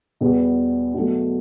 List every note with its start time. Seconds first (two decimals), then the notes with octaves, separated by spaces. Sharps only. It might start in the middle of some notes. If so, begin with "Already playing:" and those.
0.21 E2 B2 G3 B3
0.94 B2 F#3 A3